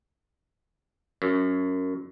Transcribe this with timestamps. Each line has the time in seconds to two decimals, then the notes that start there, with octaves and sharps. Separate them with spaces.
1.22 F#2